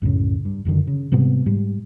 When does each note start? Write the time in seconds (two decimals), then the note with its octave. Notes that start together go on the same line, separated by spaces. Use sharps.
0.02 C2 F#2 A2 C#3
0.45 G2
0.65 F#1 F#2 D3 D#3
0.87 C#3
1.12 G#2 C3 G3 B3
1.46 G#2 G3